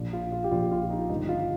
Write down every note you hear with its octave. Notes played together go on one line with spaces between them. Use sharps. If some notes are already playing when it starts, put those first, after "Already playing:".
Already playing: A#1 A#2
F4
F4
G4
A#1 A#2 F4
F4
D#4
G1 G2 D#3 D#4
F4